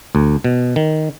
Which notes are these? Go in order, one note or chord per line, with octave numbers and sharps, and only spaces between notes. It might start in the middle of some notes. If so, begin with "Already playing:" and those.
D2
B2
D#3